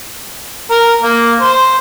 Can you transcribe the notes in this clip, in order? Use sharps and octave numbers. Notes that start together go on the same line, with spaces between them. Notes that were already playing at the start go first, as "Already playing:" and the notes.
A#4
A#3
C5